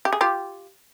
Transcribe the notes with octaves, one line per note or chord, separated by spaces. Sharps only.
G4
G#4
F4 G4